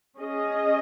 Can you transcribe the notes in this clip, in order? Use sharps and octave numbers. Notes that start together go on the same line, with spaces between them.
C#4 G#4 D#5